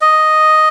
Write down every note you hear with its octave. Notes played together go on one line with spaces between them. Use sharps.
D#5